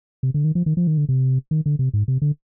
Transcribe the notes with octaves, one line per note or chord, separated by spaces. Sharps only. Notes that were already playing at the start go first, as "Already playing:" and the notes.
C3
D3
D#3
F3
D#3
F3
D#3
D3
C3
D#3
D3
C3
G#2
C3
D3